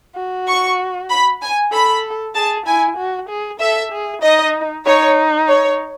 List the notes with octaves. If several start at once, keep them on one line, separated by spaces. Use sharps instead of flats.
F#4
C#6
B5
G#5
A4 B5
G#4 A5
E4 G#5
F#4
G#4
A4 E5
G#4
D#4 D#5
D#4 C#5
C#5